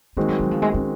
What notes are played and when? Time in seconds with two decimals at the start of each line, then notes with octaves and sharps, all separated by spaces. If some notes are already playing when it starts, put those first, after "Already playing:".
0.17 D#3 G#3 A#3 C4 F#4
0.28 F#3
0.40 F#3
0.51 F3
0.62 G#3
0.74 C#4